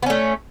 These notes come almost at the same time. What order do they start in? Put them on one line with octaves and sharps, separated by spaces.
B3 C#4 A3